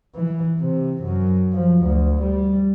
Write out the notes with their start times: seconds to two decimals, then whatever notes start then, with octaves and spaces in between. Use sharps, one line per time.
0.15 E3
0.60 C3
1.03 F#2
1.53 F3
1.84 D2
2.22 G3